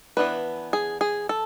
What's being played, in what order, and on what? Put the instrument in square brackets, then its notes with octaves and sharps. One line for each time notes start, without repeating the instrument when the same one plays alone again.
[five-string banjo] E3 B3 D4 B4
G#4
G#4
A4